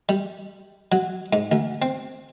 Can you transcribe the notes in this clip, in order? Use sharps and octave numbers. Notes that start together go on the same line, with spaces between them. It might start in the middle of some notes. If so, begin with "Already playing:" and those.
G3
F#3
G#2
D2
C4